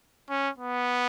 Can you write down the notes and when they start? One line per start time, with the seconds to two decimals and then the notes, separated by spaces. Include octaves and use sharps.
0.29 C#4
0.59 B3